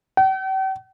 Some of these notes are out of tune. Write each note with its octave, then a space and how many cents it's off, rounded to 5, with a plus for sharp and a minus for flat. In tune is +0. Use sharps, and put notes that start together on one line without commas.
G5 -45